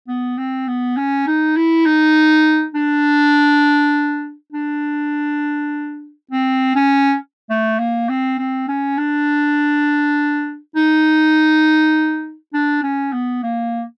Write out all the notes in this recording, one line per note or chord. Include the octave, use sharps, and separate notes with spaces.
B3
C4
B3
C#4
D#4
E4
D#4
D4
D4
C4
C#4
A3
A#3
C4
C4
C#4
D4
D#4
D4
C#4
B3
A#3